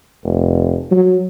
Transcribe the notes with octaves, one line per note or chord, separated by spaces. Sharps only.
F1
F#3